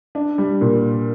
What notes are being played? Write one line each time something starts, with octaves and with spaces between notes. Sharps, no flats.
D4
G3
A#2